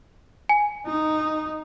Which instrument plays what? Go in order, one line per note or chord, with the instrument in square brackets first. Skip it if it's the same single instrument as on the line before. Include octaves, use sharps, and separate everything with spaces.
[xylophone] G#5
[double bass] D#4